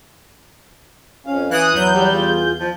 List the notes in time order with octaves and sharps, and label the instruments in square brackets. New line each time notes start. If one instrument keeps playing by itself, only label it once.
[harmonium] F2 C#4 F5
[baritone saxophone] E3 [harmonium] C#4 [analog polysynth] D#6 F#6
[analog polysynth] E2 G6 [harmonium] F#3
[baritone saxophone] G3
[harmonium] F4 G#4
[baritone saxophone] F3